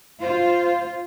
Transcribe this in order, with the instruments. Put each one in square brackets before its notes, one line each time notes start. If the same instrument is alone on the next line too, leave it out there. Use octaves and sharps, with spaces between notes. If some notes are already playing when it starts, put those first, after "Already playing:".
[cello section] F4 [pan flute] C5